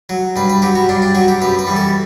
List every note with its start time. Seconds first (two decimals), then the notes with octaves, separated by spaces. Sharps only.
0.09 F#3
0.36 G2 B4
0.50 B4
0.62 F#3 G4
0.75 F#4
0.89 G2 D4
1.02 D4
1.15 F#3 F#4
1.28 G4
1.41 F#2 B4
1.59 B4
1.67 E3 G3
1.76 A4